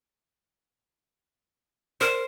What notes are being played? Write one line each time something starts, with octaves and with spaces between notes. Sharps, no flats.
A#4 C5